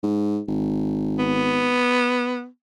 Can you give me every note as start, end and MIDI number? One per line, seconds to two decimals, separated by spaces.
0.03 0.40 44
0.48 1.84 32
1.19 2.47 59